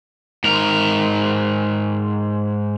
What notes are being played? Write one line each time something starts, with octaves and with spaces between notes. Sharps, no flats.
G#2 A#4